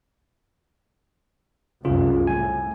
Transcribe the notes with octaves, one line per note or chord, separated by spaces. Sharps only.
F1 C2 F#2 C#3 F4
A2 G#5